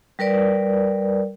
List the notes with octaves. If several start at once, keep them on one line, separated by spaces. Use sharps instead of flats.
G3 A#4 B4 D5